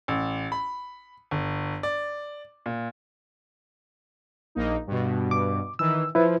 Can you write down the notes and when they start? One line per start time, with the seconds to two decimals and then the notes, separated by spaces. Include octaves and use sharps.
0.08 A1
0.52 B5
1.31 G1
1.83 D5
2.66 A#2
4.55 A#1 A#3 D#4
4.87 G2 B2
5.31 D6
5.79 D#3 E3 E6
6.15 F3 E4 B4